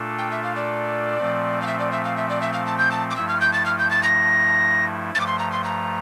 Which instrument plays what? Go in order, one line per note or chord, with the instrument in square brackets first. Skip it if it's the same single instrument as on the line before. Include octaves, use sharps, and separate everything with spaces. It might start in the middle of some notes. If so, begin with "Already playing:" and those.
Already playing: [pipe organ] A#2 A3 D4 F4 A4
[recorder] G5
E5
F5
D5
[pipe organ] A#2 F3 A3 C4
[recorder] F5
E5
D5
E5
F5
E5
D5
E5
F5
A5
G6
A5
D6
[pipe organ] G2 F3 A3 E4 [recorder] E6
[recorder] F6
G6
A6
F6
G6
A6
A#6
[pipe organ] G2 F3 A3 [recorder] A6
[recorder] D6
C6
A#5
C6
A#5